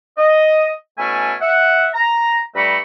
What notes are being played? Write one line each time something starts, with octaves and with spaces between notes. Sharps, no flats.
D#5
B2 A3 C#4 E4 G#5 A5
E5 F#5
A#5
G2 G3 A3 A#5 B5 C#6